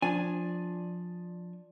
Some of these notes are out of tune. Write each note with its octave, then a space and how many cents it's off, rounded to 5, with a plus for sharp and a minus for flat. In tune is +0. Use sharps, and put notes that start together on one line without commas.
F3 +15 D4 +0 G#5 +0